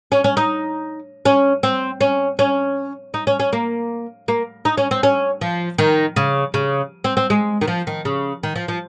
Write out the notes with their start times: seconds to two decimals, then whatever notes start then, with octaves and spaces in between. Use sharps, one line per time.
0.12 C#4
0.24 C#4
0.37 D#4
1.25 C#4
1.63 C4
2.01 C#4
2.39 C#4
3.14 D#4
3.27 C#4
3.40 C#4
3.53 A#3
4.28 A#3
4.65 D#4
4.77 C#4
4.91 C4
5.03 C#4
5.41 F3
5.78 D#3
6.16 C#3
6.54 C#3
7.04 C4
7.17 C4
7.30 G#3
7.61 D#3
7.68 F3
7.87 D#3
8.05 C#3
8.43 D#3
8.56 F3
8.68 F3